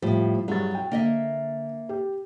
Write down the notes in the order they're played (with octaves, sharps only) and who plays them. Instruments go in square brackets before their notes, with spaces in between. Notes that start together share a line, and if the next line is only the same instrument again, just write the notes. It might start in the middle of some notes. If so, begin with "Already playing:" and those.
[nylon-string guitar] A2 [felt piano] F3 G3
[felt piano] G2 G#4 A6 [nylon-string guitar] F#3
[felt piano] G5
[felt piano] D3 [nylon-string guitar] A#3 D#5 E5
[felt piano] G4